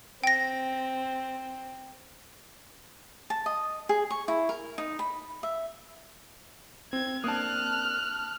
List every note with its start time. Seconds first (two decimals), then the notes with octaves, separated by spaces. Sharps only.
0.24 C4 G5 A#6
3.30 A5
3.46 D#5
3.89 G#4
4.10 C#6
4.28 E4
4.49 A#4
4.78 D#4
4.99 B5
5.43 E5
6.93 C4 G#6
7.24 A#3 C4 D4 A5 D#6 F6 F#6